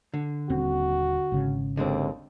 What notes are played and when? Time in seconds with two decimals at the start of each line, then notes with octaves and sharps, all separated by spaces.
0.14 D3
0.50 D#1 C4 F#4
1.32 G#1 C#3
1.77 D#2 D3 G#3 C4